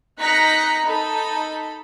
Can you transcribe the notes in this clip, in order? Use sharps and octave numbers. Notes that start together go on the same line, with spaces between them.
D#4 A#5 F#6 A#6 B6 C#7
D#4 A4 B5